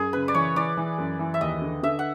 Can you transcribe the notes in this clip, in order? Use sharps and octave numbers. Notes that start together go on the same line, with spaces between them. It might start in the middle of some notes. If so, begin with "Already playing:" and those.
Already playing: F#2 G#4
C#3 B4
D5
E3 C#5
E3 D5
E3
F#2
E3
E5
D#2 D#5
D3
D3 E5
F#5